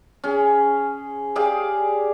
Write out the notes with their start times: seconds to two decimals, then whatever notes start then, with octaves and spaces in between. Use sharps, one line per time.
0.24 C#4 G#4
1.36 G4 G#4 D5 F5